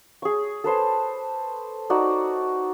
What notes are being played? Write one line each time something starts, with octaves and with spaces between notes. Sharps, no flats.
G#4 C#6
A4 B4 C5 A5
D#4 F#4 D5